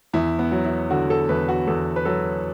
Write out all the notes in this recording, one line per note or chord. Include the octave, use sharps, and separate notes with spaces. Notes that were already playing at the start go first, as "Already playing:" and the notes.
E2 E4
B3
F#3
E4
D3 F#4
A4
E2 B4
F#4
E2 A4
B4
F#3 A4